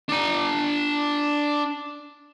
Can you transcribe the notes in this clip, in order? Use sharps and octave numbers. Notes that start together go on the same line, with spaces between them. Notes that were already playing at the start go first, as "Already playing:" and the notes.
D4 A#5